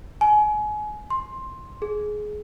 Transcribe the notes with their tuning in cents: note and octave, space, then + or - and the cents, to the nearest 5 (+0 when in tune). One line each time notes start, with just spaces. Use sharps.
G#5 +30
C6 +10
G#4 +20